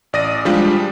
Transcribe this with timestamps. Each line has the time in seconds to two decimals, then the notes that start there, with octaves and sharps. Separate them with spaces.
0.13 A1 D5 D#6 A#6 D#7
0.45 F3 G3 G#3 D4 F4 G4